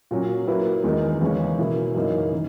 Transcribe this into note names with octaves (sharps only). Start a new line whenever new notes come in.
A#2 F#3 C#4
F#3 A#3 E4 B4
E2 D#3 G#3 D#4 A#4
E2 C#3 E3 G#3 C#4
B2 A#3 E4
F#2 C#3 E3 A#3 D#4
D#3